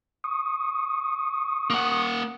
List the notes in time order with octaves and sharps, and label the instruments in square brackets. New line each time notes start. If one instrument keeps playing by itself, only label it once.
[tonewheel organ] C#6 D#6
[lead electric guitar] A#3 F#5